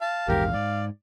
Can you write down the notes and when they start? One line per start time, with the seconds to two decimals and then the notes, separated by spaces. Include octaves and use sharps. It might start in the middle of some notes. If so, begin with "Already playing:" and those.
0.01 F5 A5
0.28 A#1 E2 G#2 G4 A#4
0.53 G#2 D5